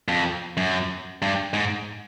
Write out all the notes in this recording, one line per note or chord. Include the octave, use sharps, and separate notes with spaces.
F2
F#2
G2
G#2